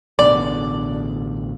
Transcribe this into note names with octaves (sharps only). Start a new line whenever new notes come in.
A1 B2 D3 D5